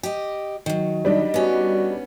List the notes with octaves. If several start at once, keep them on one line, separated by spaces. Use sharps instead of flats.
G4 D#5
D#3 F#3
G3 D4 D#4 D#5
B3 C#4 F#4